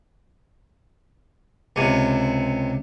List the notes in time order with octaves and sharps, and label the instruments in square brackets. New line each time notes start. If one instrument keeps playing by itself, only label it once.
[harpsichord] C#2 C3